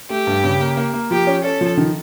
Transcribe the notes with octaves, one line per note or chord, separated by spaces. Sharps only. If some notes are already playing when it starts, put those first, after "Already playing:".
A3 G4
G2
C#3
A#3
A#3
A#3
F3 G4
C#4
C#4 A4
F3
D#3